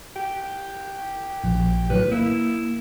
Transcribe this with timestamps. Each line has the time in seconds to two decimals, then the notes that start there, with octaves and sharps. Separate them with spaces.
0.16 G4
1.44 A#1
1.90 A2 D#3 F#3 B4
2.11 A#3 E4